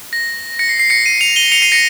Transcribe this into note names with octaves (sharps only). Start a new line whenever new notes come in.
A#6
A#6 C#7
C7
C7
A#6 C#7
C7 D#7
C#7 F7
D#7 G7
C#7 F7
C7 D#7
A#6 C#7